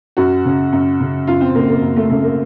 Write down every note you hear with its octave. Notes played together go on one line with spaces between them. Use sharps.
F#2 F#4
C#3
F#2
C#3
F#2 F4
C4
C#3 A#3
A#3
F#2
A3
C#3 A3
A#3